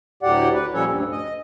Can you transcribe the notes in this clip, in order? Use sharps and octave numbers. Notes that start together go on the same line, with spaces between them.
D2 A2 F#3 G4 D5 F#5
B4
A#2 F3 G3 C#4 A4 C#5
D2 G2
D#5